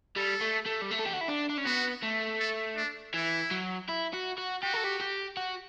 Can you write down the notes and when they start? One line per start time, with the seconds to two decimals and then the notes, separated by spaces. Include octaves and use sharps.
0.16 G3 A4
0.41 A3
0.66 A3
0.82 G3
0.91 A3
1.00 A4
1.06 G4
1.14 F#4
1.21 E4
1.28 D4
1.49 D4
1.57 C#4
1.65 B3 F#4
2.02 A3
2.39 A4
2.76 D4
3.14 E3 E4
3.51 F#3
3.89 E4
4.13 F#4
4.38 F#4
4.62 F#4 G4
4.73 A4
4.84 G4
5.00 G4
5.37 F#4